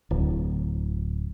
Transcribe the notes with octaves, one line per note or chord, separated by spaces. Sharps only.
D1